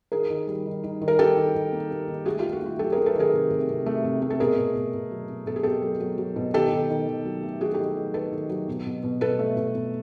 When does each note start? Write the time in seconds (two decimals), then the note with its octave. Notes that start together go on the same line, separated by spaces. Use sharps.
0.12 D#3 G#4 A#4
0.30 D#3
0.47 G3
0.66 D#3
0.83 D#3
1.01 D#3
1.08 A#4
1.19 D#3 G4 A4
1.37 D#3
1.55 D#3
1.72 A#3
1.91 A#3
2.08 D#3
2.25 A3 F#4 G#4
2.39 F4 G4
2.44 D#3
2.53 F#4
2.62 A3 F4
2.79 F#3 G4 A4
2.92 G#4 A#4
2.97 A3
3.06 A4 B4
3.16 D#3 G#4 A#4
3.33 C3
3.51 C3
3.69 C3
3.86 A3
4.04 C3
4.22 A3
4.30 A4
4.40 B2 G#4 A#4
4.57 B2
4.75 B2
4.94 B2
5.11 F#3
5.29 B2
5.46 B2 A4
5.56 G#4
5.63 B2 G4 A4
5.83 F#3
6.00 F#3
6.18 F#3
6.36 B2
6.54 D#3 G4 A4
6.72 D#3
6.90 D#3
7.07 D#3
7.25 F#3
7.43 A3
7.61 D#3 F#4 G#4
7.74 G4 A4
7.79 D#3
7.97 F#3
8.14 D#3 A4 B4
8.32 D#3
8.49 F#3
8.68 B2
8.86 B2
9.03 B2
9.21 B2 A4 B4
9.39 A3
9.56 B2
9.75 B2